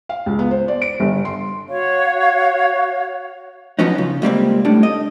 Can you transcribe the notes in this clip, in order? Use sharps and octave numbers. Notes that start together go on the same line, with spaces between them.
F5
C#2
B3
C5
D5
D7
G1
C6
F#4 C#5 F5 C#6
F3 F#3 B3 C#4 D#4
C#3
C#2 G3 A#3 C4
A2 G3 D4
D#5